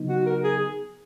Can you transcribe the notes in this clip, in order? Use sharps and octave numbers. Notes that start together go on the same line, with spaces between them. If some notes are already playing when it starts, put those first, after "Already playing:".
Already playing: C#3 F#3 B3 D#4
F#4
A#4
G#4